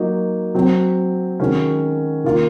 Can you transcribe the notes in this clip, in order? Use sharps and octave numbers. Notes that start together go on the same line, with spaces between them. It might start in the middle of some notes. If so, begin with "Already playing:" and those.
Already playing: F#3 A#3 D#4 F#4
F#3 C4 F#4
D#3 G#3 C#4 F#4
D#3 A#3 F4